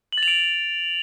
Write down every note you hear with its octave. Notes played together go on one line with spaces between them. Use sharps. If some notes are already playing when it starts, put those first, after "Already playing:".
F#7
A6
F7
D7